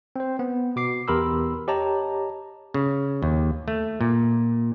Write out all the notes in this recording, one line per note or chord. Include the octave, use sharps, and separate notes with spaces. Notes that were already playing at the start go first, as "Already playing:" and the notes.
C4 C5
B3
B2 D6 C7
E2 G4 A#4 B5 C6 E6
G4 C#5 D#5 A5 A#5
C#3
D#2
A3
A#2